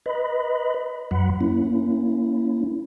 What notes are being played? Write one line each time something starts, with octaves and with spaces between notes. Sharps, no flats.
B4 D#5 B5
F#2 F#3 F#5 B5
A#3 C#4 E4